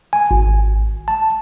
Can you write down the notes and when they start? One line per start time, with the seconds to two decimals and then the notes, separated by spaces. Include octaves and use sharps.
0.13 G#5
0.31 G#1
1.08 A5